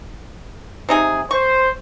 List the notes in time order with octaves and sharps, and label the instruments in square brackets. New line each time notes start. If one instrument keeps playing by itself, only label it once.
[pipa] C3 D#4 G#4
[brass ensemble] C5 [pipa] C#6